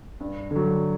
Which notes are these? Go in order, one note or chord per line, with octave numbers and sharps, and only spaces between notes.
G2
D3 F#3